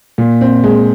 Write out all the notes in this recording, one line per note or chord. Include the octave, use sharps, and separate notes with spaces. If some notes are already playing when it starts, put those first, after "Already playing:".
A#2
C4
G#3